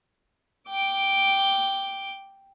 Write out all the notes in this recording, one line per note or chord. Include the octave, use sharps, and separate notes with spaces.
G5 D6